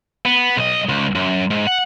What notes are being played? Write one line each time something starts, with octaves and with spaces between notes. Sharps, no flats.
B3
B1 D#5
C#2
F#2
G#2
F#5